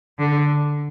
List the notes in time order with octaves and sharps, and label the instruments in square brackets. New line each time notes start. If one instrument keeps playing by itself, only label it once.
[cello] D3